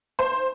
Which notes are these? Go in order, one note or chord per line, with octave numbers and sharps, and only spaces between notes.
C5